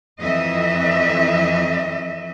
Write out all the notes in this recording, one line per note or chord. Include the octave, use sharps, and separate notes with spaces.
F2 E3 D#5 E5